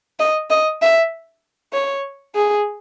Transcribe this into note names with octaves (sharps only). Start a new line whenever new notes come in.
D#5
D#5
E5
C#5
G#4